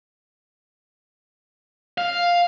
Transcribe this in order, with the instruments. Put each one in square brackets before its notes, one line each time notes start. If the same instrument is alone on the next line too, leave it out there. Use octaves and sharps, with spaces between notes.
[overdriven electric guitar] F5